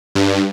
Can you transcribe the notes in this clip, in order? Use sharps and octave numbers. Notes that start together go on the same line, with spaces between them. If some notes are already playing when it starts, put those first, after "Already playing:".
G2